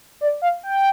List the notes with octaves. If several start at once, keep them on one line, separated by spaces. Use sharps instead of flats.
D5
F5
G5